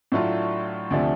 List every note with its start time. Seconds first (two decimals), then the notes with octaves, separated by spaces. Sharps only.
0.12 A2 F#3 A3 D4 F4
0.91 D2 C3 F3 A3 D4